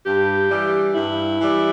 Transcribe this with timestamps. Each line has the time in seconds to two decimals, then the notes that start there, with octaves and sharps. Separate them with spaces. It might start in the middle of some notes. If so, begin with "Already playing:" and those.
0.05 G2 G4
0.50 E3 G3
0.94 G2 E4
1.39 E3 G3